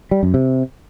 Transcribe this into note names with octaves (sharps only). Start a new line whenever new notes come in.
G3
F#2
C3